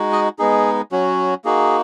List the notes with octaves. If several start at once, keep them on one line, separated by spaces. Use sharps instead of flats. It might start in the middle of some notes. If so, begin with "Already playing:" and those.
Already playing: G#3 D#4 F#4
D#5
G#3 B3 D#4 G#4
F#3 C#4 F#4
A#3 D#4 F#4 G#4